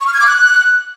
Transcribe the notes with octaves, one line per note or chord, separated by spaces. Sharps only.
C#6
F6
G#6
D6
F#6